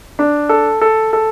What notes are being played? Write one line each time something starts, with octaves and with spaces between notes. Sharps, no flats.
D4
A4
A4
A4